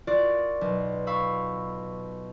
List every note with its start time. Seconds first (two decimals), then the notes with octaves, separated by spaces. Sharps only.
0.07 F4 F#4 A#4 D5
0.61 B1
1.07 F5 B5 C#6 E6